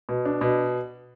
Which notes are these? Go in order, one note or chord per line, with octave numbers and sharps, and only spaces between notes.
B2
D4
B2